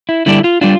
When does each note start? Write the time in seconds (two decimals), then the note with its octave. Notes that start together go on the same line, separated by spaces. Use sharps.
0.09 E4
0.26 D3 G3 D4 E4
0.44 F4
0.61 G3 D4 F4